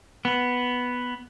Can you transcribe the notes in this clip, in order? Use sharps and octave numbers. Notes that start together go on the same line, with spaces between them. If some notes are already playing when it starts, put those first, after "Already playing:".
B3